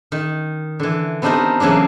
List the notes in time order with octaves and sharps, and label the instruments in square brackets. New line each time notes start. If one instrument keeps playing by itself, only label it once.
[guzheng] D#3
D3 E3
B3 C4 D4 D#4 G4 A#4
C#3 E3 F#3 A#3 D4